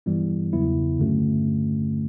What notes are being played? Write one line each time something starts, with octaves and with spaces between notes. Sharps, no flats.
G2 E3 G3 B3 E4
E2 C#3 F#3 B3 E4
G2 D3 A3 C#4 F#4